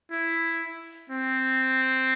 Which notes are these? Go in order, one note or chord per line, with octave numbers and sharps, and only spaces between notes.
E4
C4